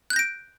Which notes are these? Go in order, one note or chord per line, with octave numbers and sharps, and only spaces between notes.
F#6 G6 A#6 D7